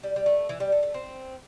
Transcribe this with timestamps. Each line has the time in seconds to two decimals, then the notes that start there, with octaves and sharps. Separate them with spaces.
0.03 G3
0.16 G3
0.26 A3
0.49 E3
0.60 G3
0.72 A3
0.83 A3
0.94 C4